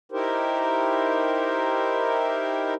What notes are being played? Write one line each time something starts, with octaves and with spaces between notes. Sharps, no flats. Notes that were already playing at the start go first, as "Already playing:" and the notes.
D#4 E4 G4 A#4 C5